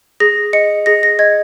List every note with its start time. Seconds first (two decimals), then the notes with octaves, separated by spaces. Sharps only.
0.20 G#4 A#6
0.53 D#5 C#7
0.86 G#4 A#6
1.03 A#6
1.19 D#5 G#6